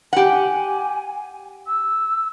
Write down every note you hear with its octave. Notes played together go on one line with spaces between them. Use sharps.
G4 F#5 G#5
E6